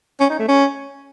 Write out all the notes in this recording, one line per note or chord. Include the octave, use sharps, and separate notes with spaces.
C#4
D#4
A3
C#4